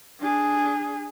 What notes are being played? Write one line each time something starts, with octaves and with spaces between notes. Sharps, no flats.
D4 G#4